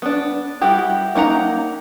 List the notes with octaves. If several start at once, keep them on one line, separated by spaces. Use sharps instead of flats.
B3 D4
G3 E4 F#4 G4
A#3 D#4 F#5 A#5